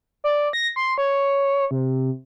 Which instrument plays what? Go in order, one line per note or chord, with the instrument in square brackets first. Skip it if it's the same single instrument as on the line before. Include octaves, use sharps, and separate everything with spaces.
[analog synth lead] D5
A#6
C6
C#5
C3